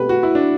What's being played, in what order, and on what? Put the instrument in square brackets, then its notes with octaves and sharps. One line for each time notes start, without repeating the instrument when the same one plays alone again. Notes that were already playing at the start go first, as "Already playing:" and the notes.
Already playing: [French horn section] B2 A3 C4 G4 [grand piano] B4
[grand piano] F#4
E4
D4